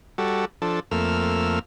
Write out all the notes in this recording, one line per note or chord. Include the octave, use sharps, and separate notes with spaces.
G3 F#4 A4
F3 D4 A4
F2 A3 A#3 E6 F6